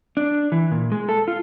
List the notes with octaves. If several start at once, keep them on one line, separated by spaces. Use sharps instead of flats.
D4
E3
A#2
G#3
A4
F4